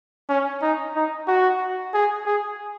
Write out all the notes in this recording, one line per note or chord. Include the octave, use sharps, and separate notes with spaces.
C#4
D#4
D#4
F#4
G#4
G#4